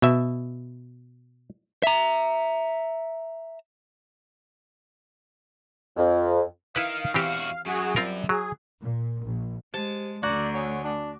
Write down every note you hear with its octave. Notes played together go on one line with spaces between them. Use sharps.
B2 E5
E5 A#5
F2
D#3 E4 B4 F5
E2 E3 C4 F#4 G4
F#2 F#4 G#4
G3 C4 F4 A#4
F#3 G#4
A#2
A#1
G#3 G4 C5 A5
D2 D3 F#4 D5 A#5 G6 G#6
C#5 F#5 G#5 D#6
D4 D6